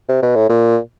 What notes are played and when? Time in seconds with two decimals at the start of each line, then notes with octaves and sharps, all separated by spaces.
0.09 C3
0.23 B2
0.36 A2
0.49 A#2